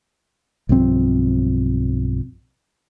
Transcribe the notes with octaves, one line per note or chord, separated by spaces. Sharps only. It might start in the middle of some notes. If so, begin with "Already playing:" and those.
B1 G2 F3 C4